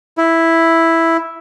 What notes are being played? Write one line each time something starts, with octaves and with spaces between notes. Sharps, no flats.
E4